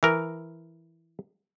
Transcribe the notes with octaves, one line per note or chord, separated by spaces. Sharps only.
E3 A#4